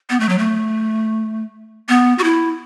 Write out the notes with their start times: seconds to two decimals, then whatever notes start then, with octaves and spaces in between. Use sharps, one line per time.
0.10 B3
0.20 A3
0.29 F#3
0.38 A3
1.89 B3
2.18 F#4
2.24 E4